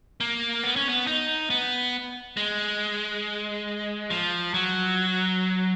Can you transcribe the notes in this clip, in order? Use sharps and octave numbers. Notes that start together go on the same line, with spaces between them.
A#3
B3
C#4
B3
D#4
B3
G#3
F3
F#3